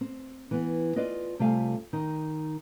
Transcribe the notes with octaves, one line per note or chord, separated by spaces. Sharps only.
C4
E3 B3
F4 B4 D5 D#5
C3 G3 A3 F4 F5 G#5
D#3 D#4